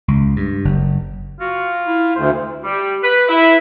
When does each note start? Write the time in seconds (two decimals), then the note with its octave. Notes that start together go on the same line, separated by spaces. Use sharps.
0.08 C#2
0.36 G2
0.65 F#1
1.40 F4 F#4
1.87 E4
2.16 D2 C5
2.64 G3
3.04 B4
3.29 E4